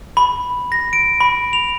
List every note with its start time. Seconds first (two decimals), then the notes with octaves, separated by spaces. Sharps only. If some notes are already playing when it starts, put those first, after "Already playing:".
0.17 B5
0.72 A#6
0.93 D7
1.20 B5
1.53 F7